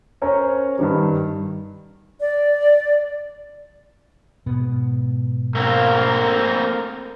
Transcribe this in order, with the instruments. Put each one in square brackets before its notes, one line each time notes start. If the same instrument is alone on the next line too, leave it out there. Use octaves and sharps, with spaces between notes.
[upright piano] C#4 A#4 C5 C#5
G2 D#3 G3
[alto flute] D5
[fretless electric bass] G#2 B2 B3
[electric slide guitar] A3 A#3 C4 [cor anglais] A#4